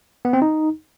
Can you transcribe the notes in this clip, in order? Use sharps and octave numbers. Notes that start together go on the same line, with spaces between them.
B3
C4
D#4